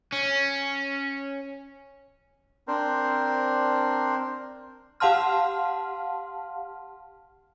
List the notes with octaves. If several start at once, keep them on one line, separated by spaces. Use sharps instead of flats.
C#4
C4 D4 A#4 C5
G4 F5 F#5 A5 C6 F6